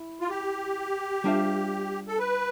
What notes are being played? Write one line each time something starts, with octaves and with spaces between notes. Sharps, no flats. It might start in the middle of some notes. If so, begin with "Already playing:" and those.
Already playing: E4
F4
G4
G3 D4 F4 C5 E5
A4
B4